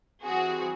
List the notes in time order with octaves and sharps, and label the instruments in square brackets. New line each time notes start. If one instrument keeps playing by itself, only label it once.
[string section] E3 G3 C4 F#4 G#4